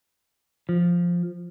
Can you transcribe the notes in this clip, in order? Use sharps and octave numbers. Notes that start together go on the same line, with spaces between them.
F3